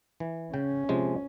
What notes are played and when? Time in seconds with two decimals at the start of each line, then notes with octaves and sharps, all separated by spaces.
0.20 E3
0.54 C#3 C#4 G5
0.89 C3 F3 G#3